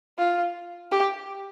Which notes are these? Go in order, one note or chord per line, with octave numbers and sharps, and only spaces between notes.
F4
G4